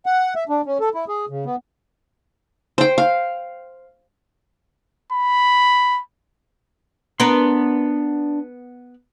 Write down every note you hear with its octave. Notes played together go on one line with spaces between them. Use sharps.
F#5
E5
D4
C#4
A4
E4
G#4
C#3
B3
C5 G5
F5
B5
B3 D4 A#4 B4 C6